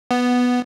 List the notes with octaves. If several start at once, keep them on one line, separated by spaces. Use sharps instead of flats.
B3